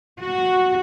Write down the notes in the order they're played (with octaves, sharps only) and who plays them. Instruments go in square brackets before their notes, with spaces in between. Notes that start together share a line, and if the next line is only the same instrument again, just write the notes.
[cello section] F#4